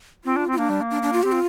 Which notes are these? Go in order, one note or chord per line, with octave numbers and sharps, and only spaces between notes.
C4 F4
D4
C4
F4
A#3 D4
G3
A#3
D4
D4
F4
C4 G4
F4